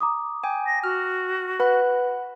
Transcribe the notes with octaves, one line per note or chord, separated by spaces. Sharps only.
A#5 D6 D#6
G5 G#5
A#6
F#4 F6
B4 F#5 B5 F#6